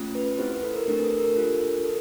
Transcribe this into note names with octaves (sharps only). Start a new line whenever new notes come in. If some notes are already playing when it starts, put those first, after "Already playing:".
Already playing: A3 C#4 F4
B4
B4
C4 E4 G4 C5
B4
A4
A#4
A3 D4 G4 A#4
A4
A#4
D4 F4 A4
A4